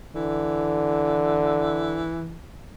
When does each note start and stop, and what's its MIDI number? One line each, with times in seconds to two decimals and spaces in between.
0.16 2.09 50
0.16 2.36 52